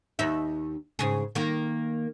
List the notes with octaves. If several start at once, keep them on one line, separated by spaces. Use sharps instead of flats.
D#2 D#4 E5
G#2 C#3 G#4
D#3 A#3